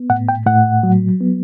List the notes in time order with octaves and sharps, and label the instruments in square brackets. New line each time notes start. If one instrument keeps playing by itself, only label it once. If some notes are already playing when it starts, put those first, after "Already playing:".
Already playing: [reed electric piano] B3
A2 F#5
G5
A2 F#5
F#3
B3